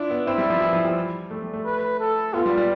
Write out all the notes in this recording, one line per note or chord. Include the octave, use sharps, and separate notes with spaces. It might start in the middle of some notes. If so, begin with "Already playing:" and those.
Already playing: D4 E4 F4
B3
C4 E4
G3
F3
E3
F3
G3
A3
G3
A3
B4
A4
B3 F4
G3
G3